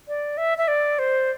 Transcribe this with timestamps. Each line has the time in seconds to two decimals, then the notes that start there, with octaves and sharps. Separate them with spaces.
0.08 D5
0.38 E5
0.58 E5
0.68 D5
0.99 C5